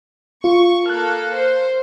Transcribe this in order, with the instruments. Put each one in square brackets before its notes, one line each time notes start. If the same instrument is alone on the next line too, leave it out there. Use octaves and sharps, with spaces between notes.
[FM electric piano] F4 [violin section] C#6
[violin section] A#3 A4 [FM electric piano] F6 F#6
[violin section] C5